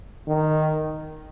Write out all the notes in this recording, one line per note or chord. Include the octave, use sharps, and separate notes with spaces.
D#3